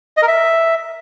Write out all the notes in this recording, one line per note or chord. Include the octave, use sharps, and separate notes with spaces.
D#5
A#4
E5